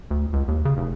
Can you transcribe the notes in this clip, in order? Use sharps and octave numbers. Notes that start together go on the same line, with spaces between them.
D2
C#2
D#2
C#3
F1